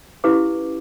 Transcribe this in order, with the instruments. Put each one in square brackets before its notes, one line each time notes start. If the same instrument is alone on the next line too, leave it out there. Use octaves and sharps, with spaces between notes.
[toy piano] C#4 E4 G4 B4 F5 D6